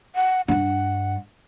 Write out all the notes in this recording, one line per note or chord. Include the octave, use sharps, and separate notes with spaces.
F#5
G2 D4 F#5